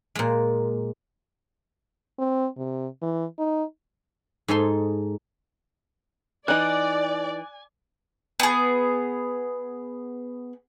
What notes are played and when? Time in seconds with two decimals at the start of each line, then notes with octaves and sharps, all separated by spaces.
0.15 A#2 G#3
2.18 C4
2.57 C3
3.02 E3
3.38 D#4
4.48 G#2 D#4 A4 C6
6.48 E3 D#4 D5 G#5 F#6 F#7
8.40 B3 G#4